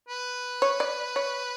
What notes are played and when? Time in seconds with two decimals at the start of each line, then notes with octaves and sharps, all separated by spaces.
0.08 B4
0.62 C#5
0.80 D5
1.16 C#5